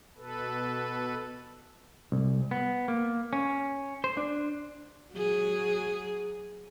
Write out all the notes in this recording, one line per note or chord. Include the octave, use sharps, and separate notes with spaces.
B2 A4 B4
C2
B3
A#3
C#4
C5
D4
F#3 G#4